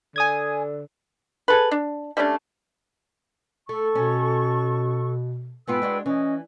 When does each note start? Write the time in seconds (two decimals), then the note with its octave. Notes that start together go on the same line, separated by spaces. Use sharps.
0.16 D3 G#5 D#6 G#6
1.48 G#4 A4 B4
1.71 D4
2.17 G3 A3 C#4 D4
3.69 A3 A4 C#6
3.95 B2 C#4
5.67 G#2 B3 F4 B4 G5 E6
5.82 G#3 D4 F#4
6.06 E3 C#4 D#5